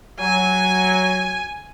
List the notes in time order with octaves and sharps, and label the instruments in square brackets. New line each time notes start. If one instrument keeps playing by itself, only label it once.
[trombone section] F#3 [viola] G#5